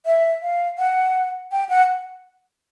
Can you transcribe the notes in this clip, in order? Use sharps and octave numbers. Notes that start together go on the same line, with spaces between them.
E5
F5
F#5
G5
F#5